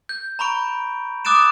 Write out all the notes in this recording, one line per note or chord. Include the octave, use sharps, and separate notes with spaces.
G6
A#5 B5 C#6 D7
D6 D#6 F#6 A6 D7 E7